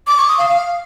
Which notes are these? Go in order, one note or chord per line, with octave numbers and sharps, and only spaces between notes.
D6
C#6
D#6
F5
F5